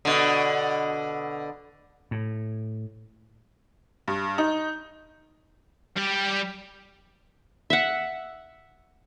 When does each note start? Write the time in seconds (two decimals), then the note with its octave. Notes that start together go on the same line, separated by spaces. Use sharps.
0.05 B2 D3
2.11 A2
4.08 G2
4.38 D#4
5.97 G3 G4
7.70 E5 F#5